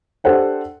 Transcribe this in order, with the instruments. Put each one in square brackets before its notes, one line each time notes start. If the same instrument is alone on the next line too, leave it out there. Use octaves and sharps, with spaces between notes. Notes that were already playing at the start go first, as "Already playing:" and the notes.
[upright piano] D4 G4 A4 C5 F#5 G5